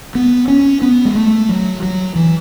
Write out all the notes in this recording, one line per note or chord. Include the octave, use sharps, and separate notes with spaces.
B3
C#4
B3
G#3
A3
F#3
F#3
E3